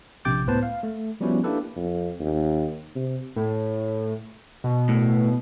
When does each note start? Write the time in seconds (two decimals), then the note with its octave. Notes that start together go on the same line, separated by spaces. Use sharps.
0.25 A#1 C3 G5 D6 G6 A6
0.47 C#2 A2 B3 B4 C5 A5
0.63 F5
0.83 A3
1.20 F3 G3 B3 C#4 E4 F#4
1.44 A#3 D4 E4 G4 A4 B4
1.76 F2
2.20 D#2
2.95 C3
3.36 A2
4.64 B2
4.89 A2